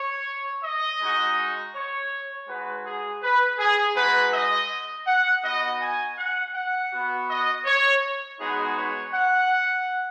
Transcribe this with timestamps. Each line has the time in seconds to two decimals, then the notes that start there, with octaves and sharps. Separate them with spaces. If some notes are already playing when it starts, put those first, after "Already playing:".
Already playing: C#5
0.63 D#5
1.00 G#3 D#4 F#4
1.75 C#5
2.48 G#3 D#4 F#4 B4
2.85 G#4
3.22 B4
3.59 G#4
3.96 G#3 D#4 F#4 B4
4.33 D#5
5.07 F#5
5.44 B3 D#4 F#4 D#5
5.81 G#5
6.17 F#5
6.54 F#5
6.92 B3 F#4
7.29 D#5
7.66 C#5
8.39 G#3 B3 D#4 F#4 G#4
8.76 C#5
9.14 F#5